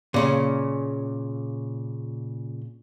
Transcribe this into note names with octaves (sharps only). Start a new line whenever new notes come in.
A#2 C#3 C#4